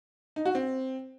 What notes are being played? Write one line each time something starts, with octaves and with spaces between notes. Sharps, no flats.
D#4
F#4
C4